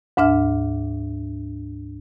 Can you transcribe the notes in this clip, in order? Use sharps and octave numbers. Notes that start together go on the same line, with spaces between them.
D2 G#2 D4 E5 F6